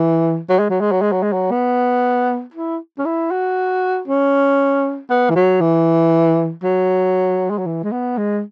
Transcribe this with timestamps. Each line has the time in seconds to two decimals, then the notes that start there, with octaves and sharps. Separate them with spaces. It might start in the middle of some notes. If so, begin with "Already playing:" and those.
Already playing: E3
0.50 F#3
0.60 G#3
0.70 F#3
0.81 G#3
0.92 F#3
1.02 G#3
1.12 F#3
1.23 G#3
1.33 F#3
1.51 B3
2.54 E4
2.99 C#4
3.06 E4
3.31 F#4
4.08 C#4
5.10 B3
5.30 E3
5.36 F#3
5.61 E3
6.64 F#3
7.50 G#3
7.59 F#3
7.66 E3
7.84 G#3
7.92 B3
8.18 G#3